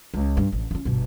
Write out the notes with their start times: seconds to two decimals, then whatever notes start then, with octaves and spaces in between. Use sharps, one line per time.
0.14 C#2
0.37 G2
0.53 A1
0.71 C#4 F4
0.85 G1 B2